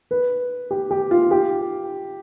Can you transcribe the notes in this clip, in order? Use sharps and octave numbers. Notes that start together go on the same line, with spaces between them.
B4
G4
G4
F4
G4